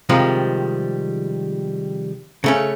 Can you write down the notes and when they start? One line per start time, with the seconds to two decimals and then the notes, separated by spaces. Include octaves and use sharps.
0.09 C3 D#3 F3 G3 G#3
2.44 C#3 A3 C#4